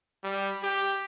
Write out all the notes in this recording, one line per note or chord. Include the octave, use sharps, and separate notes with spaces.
G3
G4